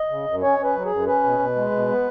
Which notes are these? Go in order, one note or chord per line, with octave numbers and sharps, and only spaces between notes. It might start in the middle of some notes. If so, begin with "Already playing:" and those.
Already playing: D#5
C#3
F#2
C#4 C#5
C#4
B4
F#3
G#4
F#2
C#4 B4
B2
B2
G#3
B2
B3